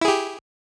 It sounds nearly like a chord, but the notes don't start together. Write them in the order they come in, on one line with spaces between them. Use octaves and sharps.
E4 G#4 G4